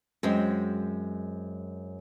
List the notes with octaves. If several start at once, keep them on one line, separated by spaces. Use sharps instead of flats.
F#2 G#3 C4